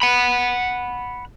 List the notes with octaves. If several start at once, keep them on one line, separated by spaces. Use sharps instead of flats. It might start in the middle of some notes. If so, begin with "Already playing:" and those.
F#5 B5